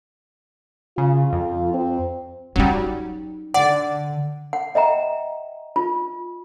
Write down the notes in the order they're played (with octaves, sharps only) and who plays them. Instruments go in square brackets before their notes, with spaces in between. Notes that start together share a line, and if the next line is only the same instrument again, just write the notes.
[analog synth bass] C#3 [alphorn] F4
[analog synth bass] F2
[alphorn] C4
[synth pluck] F#3 G3 [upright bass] C#4 D#4
[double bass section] D3 [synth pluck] D5 [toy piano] F#5
[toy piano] F#5
D#5 E5 G5 A#5
F4